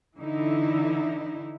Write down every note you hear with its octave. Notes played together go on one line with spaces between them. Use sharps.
D3 E3 D#4 E4